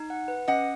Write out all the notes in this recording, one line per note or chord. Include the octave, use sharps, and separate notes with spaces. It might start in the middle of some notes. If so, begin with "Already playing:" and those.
Already playing: D#4
F#5
B4
C#4 D#5 F#5